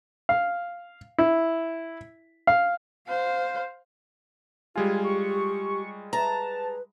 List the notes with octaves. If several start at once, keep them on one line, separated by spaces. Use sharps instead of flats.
F5
E4
F5
C5 F5
G3 G#3 F4 G4 G#5
C#6
B4 A5 A#5